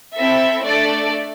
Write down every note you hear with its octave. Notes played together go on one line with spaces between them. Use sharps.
C4 E4 A4 E5
A3 D4 A4 D5